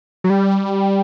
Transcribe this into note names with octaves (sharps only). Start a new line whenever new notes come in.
F#3
G3